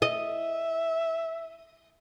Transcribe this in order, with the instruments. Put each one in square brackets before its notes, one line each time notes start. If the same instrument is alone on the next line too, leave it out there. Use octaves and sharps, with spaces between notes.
[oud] D#5 [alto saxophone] E5